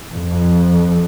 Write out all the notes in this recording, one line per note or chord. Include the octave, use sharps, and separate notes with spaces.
F2